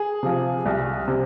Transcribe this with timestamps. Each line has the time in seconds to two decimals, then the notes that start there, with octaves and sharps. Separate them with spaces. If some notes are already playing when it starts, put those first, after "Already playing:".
Already playing: G#4
0.23 C3 F3
0.66 C2
1.08 C3